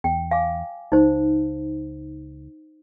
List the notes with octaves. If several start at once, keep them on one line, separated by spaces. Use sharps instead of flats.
E2 G5
F5 G#5 D6
C#2 D#4 C5